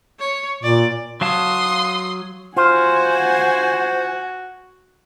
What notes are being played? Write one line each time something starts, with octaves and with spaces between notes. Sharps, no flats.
C#5
A#2 D5
F#3 F5 A5 C6 D#6
F4 F#4 C5 F#5 G#5